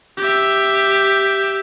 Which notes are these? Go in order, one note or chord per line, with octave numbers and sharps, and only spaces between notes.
G4 E5